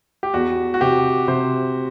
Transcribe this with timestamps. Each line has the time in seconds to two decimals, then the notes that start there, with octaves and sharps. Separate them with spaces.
0.23 G4
0.34 E2 F#4
0.74 F#4
0.81 C3 G4
1.28 C3 C5